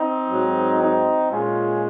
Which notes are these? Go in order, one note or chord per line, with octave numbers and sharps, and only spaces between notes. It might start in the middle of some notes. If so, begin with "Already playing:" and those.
Already playing: C4 D#4
G#2 F#3
C4 D#4
A#2 G#3 C#4 F4